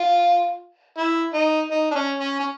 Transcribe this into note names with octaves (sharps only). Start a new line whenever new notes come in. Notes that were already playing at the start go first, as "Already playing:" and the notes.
Already playing: F4
E4
D#4
D#4
D4
C#4
C#4
C#4